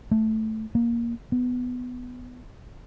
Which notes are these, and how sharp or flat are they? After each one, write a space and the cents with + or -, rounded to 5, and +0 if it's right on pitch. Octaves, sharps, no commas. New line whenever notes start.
A3 +0
A#3 +10
B3 +10